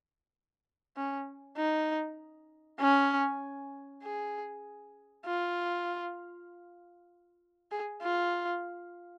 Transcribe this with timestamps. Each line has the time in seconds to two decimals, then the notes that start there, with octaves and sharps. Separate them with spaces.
0.97 C#4
1.57 D#4
2.80 C#4
4.03 G#4
5.26 F4
7.71 G#4
8.02 F4